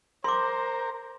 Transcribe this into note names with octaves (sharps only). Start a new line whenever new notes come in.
A#4 C5 C6 D6